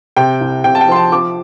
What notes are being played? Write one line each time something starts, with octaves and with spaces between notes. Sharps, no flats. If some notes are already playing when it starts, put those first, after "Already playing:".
C3 G5
C2
C3 G5
A5
G5
F3 C6
A5
F3 D6